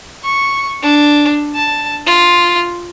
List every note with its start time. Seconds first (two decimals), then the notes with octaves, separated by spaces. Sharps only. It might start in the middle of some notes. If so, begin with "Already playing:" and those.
0.24 C#6
0.82 D4
1.55 A5
2.06 F4